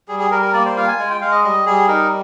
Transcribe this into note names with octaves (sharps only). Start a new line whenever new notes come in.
G3 G#4
G#4
G3 A#4
A#4
A#3 D5
C5
F4 F5
G#5
G#3 G#5
G5
G#3 F5
D#5
G3 D#5
G3 G#4
D#4 A#4